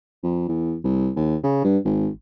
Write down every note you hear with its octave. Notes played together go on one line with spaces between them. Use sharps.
F2
E2
C2
D#2
C#3
G2
G#1